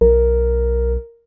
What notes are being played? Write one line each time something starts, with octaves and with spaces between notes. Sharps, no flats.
B1 A#4